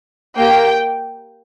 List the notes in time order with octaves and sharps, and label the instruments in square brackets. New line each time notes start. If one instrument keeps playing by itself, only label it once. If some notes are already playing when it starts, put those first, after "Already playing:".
[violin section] A#3 G4 G5